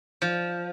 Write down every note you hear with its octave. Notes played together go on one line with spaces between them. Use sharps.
F3